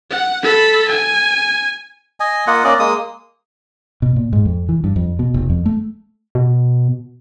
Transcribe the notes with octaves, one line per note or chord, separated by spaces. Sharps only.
F#5
A4 B5
G#5
D#5 G#5
A#3 F4 D#5 F#5
A#3 C#4 D5 D#5
G#3 A#3 D#6
B2
A#2
G#2
F2
E3
G2
F2
B2
F1
F2
A3
B2